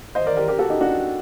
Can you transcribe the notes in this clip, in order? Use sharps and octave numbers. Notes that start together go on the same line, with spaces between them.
C5 D#5
A#4 D5
G4 A#4
G4 A#4
F#4 A4
D#4 G4
D4 F#4